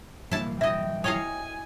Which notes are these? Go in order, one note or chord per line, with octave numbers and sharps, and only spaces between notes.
D3 E3 G3 A#3 E4 A5
E4 D#5 E5 G5
E4 C#5 D#5 F5 G5 G#5 D#6